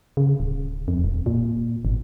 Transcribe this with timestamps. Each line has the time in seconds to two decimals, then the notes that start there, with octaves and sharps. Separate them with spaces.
0.17 C#3
0.40 D1
0.88 F2
1.04 D#1
1.26 A#2
1.85 G#1